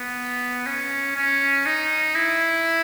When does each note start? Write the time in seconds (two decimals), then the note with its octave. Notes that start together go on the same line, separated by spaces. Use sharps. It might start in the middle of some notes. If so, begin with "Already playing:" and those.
Already playing: B3
0.66 C#4
1.16 C#4
1.66 D#4
2.16 E4